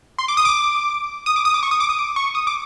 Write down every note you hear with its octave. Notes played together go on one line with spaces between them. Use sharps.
C6
D6
D#6
D6
D#6
D6
D#6
D6
C#6
D#6
D6
D#6
D6
C#6
D#6
D6